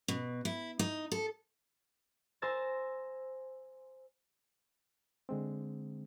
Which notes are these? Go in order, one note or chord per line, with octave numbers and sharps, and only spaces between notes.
B2
E4
D#4
A4
C5 G#5 A#5 E6 A6 A#6
D3 G#3 C4